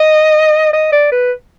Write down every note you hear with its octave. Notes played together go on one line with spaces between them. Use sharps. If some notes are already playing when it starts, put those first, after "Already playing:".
Already playing: D#5
D#5
D5
B4